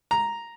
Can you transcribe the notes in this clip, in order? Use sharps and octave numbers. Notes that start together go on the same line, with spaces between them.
A#5